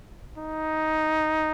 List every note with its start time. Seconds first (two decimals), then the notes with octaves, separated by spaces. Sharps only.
0.38 D#4